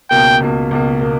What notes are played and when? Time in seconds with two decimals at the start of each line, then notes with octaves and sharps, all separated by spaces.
0.11 C#2 B2 A#3 G5
0.41 C#2 B2 A#3
0.71 C#2 B2 A#3
1.01 B2 A#3